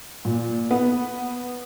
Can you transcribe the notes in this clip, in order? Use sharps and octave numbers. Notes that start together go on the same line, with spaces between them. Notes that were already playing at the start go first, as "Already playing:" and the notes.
A#2
B3